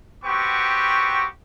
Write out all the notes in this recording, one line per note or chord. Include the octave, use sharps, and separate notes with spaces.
B3 C4 F#4 G4 C#6